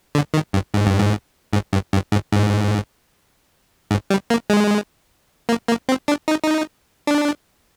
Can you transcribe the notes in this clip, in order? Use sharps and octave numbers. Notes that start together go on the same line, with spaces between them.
D3
D#3
G2
G#2
G2
G#2
G#2
G2
G2
G#2
G#2
G#2
G3
A#3
G#3
A#3
A#3
C4
D4
D#4
D#4
D4